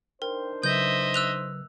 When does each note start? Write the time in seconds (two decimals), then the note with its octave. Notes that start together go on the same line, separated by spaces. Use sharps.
0.22 D4 D#4 A#4 C5 G5
0.63 C#3 F#3 B4 D#5 E5 G6
1.14 E6 F#6 F7